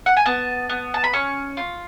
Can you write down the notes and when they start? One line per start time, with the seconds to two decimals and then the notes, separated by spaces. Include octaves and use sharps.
0.06 F#5
0.17 G#5
0.26 B3 A5
0.69 B3
0.94 A5
1.04 B5
1.13 C#4 C#6
1.57 F4